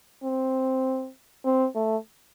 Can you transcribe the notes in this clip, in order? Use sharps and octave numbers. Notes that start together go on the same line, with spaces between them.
C4
C4
A3